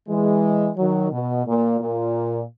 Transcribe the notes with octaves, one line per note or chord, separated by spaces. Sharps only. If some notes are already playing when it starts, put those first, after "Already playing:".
E3 G#3
D#3 F#3
B2
A#2
A#2